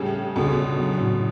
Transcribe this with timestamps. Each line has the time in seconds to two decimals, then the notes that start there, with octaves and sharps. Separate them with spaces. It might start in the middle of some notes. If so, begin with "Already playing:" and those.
Already playing: A2 C#3 G3
0.15 G3
0.36 C#2 B2 D3
0.57 C#2
0.79 F#3
1.01 A2